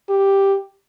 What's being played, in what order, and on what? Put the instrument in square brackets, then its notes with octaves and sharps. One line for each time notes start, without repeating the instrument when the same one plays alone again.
[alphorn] G4